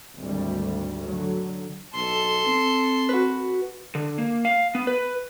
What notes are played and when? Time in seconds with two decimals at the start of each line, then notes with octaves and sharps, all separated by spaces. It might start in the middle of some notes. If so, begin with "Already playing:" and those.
0.18 G#1 D2 G3
1.08 D3 F#3
1.95 B1 A4 C6
2.46 C4
3.09 F#4 B4
3.95 D3
4.18 A#3
4.45 F5
4.75 B3
4.87 B4